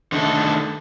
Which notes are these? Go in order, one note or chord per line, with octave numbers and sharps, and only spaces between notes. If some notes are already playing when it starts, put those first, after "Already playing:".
D3 D#3 A3 A4